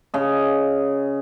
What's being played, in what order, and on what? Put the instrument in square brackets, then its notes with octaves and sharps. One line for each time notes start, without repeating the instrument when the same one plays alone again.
[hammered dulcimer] C#3 D#5